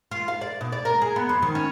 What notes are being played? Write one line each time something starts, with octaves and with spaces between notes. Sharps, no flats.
F4
F5
D5
B2
D5
A#4
G#4
B3
F2
D#3
C#4